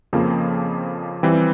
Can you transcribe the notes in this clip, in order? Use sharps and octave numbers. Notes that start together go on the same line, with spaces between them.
F2 C#3 F3 A#3
E3 G3 C4